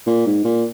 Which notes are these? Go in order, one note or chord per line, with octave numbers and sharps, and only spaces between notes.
A#2
G#2
A#2